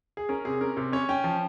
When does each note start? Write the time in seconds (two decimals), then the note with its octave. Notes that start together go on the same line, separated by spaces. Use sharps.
0.17 G#4
0.29 C#4 A#4
0.45 C3 G#4
0.61 C#4 A#4
0.77 C3
0.92 C#4 C#5
1.09 C#4 G5
1.24 F3